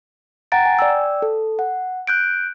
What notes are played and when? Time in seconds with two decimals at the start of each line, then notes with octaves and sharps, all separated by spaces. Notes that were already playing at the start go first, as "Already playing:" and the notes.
0.52 F#5 G5 A#5 A6 D7
0.66 G#5
0.79 D5 G5 E6
1.22 A4
1.59 F#5
2.07 F#6 G6 D7